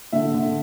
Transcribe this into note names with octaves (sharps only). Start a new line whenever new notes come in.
D3 E5
D3